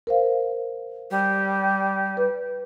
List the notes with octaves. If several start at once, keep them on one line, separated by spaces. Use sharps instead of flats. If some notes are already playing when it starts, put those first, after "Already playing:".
A#4 C5 F5
G3
B4